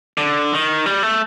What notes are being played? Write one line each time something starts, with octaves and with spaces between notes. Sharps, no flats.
D3
D#3
G3
A3